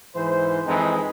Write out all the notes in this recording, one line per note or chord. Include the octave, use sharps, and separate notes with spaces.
G#2 E3 C5
F2 E3 G#3 C4 D#4